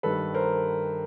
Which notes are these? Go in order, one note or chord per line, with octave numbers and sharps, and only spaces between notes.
G2 D#3 A4 B4
A#4 C5